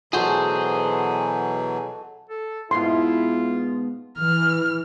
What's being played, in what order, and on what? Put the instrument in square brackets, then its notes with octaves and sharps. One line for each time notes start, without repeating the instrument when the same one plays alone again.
[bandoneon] B2 E3 F#3 [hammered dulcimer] F#4 A4 [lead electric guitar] G#4 C5
[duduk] A4
[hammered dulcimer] G#2 B2 [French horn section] E4 [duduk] F4 [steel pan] C6
[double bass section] E3 [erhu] F6